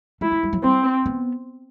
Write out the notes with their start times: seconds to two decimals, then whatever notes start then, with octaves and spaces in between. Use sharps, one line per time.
0.21 A3 E4
0.32 A3
0.43 G3
0.53 F#3
0.64 G3 C4
1.06 B3